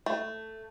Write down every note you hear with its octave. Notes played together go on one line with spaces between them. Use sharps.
A3